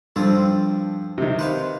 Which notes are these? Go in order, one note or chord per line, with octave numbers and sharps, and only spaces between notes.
G2 F3 C4 A4
C3 D#3
B4 C5 F5